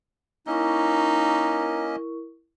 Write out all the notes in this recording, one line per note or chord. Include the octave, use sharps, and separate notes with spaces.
A#3 C#4 D#4 E4 A#4 D#5 C#6